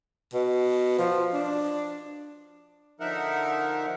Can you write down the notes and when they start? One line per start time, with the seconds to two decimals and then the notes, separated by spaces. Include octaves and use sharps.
0.34 B2
0.98 F3
1.33 D4
3.00 D3 F3 D#4 A#4 E5 F#5